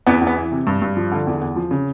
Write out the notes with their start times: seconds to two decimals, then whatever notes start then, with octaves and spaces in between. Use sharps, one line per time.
0.07 E2 B3
0.21 E2
0.27 B3
0.37 E3
0.52 C3
0.67 G2
0.82 G2
0.97 F3
1.12 D3
1.27 E2
1.41 E2
1.56 F3
1.71 C#3